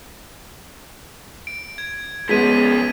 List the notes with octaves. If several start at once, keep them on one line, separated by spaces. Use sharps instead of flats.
D7
G#6
F3 G#3 B3 C#4 B6 D#7